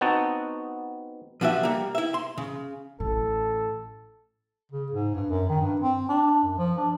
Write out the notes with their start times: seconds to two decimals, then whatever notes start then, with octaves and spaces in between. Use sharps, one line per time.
0.01 B3 C4 D#4 F#4 A5
1.41 F3 D4 F#4 G4 E5
1.63 G3 A#3
1.95 E4 E5
2.14 C6
2.38 C#3
3.00 A1 A4
4.71 C#3
4.92 G#2
5.14 G2
5.29 F#2
5.49 D#3
5.61 G2
5.80 C4
6.08 D4
6.43 F#2
6.58 F3
6.77 D4